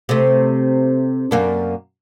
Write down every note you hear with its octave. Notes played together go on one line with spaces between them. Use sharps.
C3 A3
F#2 A#3 D4